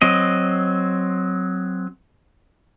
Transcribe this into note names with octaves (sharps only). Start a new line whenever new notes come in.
F#3 C4 D#5